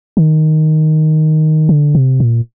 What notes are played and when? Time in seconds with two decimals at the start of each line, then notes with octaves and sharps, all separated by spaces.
0.17 D#3
1.69 D3
1.95 C3
2.20 A#2